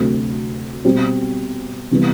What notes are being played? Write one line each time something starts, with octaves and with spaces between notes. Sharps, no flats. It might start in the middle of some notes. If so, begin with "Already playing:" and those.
Already playing: D2 C3 F#3 C4
B2 G3 C4 G4
C3 E3 G3 B3